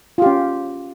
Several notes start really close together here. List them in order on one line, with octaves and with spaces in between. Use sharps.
F4 G4 C#4